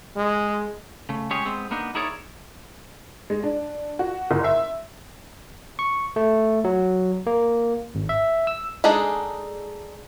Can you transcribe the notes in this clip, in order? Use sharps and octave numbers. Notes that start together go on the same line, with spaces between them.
G#3
C#3 A3
G#3 C#4 G4 G#4 C#5
G#3 B3 C4
A#3 B3 D4 D#4
D#4 E4 G#4 A#4 C#5 D5
G#3
D4
F#4
F#1
E5
C#6
A3
F#3
A#3
G#1
E5
E6
G#3 D4 D#4 G#4 A4